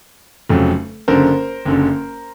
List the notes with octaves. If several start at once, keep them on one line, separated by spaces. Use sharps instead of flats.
F1 F2 C#3 F#3
F#1 F#2 D3 A#4 C5
F#1 F#2 D3